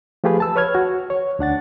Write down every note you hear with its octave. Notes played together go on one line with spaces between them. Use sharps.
F3 A3 F4 G4 G#4 B4
A5 E6
B4 C#5 F6 G#6
F#4
C#5
D2 D4 F#5 A6